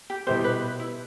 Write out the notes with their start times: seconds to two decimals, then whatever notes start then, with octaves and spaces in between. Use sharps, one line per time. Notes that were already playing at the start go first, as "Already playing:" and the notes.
0.10 G4
0.27 B2 G3 B3 E4 G4 C5
0.44 B4
0.80 E4